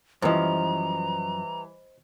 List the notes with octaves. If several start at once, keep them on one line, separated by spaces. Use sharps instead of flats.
F#2 E3 F3 G3 C5 D#5 A#5